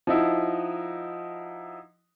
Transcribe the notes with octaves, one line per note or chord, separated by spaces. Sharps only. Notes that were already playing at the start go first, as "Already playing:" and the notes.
F3 D#4 E4 F#4